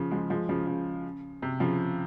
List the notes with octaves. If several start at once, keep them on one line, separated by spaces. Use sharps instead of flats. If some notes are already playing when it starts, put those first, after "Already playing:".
Already playing: C#3 F3
F3 G#3
F3 G#3
C#3 F3
C#3
C3
C#3 F3